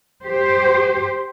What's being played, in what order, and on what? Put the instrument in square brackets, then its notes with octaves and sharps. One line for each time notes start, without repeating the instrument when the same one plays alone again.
[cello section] G4 C5